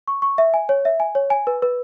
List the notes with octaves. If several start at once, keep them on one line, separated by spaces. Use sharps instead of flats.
C#6
C#6
E5
G#5
C#5
E5
G#5
C#5
G#5
B4
B4